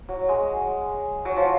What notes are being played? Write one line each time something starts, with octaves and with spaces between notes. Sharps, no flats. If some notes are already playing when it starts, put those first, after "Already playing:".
F#3
G#3
F#3
F3